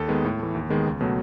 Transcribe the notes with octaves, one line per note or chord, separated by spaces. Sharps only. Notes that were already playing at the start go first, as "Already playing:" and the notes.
Already playing: D#2 A4
D#3 G#3 B3
A2
E3 A3
D#2
D#3 G#3 B3
C#2
B2 F#3 A3